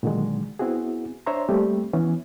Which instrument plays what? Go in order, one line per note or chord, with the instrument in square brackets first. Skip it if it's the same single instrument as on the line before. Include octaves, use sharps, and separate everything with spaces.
[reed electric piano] A#2 D3 D#3 F#3 G#3
B3 C4 E4 F#4 G#4
D4 C5 C#5 E5 A#5 C6
G3 A3 A#3 C4 G4
E3 B3 C#4